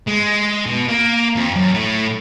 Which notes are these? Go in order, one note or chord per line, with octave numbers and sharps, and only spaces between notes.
G#3
B2
A#3
F2
F#2
A2 A3